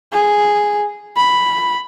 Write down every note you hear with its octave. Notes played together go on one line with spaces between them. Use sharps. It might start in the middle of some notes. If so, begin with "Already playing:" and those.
G#4
B5